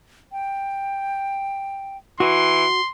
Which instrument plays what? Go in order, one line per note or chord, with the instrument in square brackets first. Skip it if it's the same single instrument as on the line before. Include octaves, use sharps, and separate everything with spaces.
[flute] G5
[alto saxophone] E3 [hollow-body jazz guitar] F#4 [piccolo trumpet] C6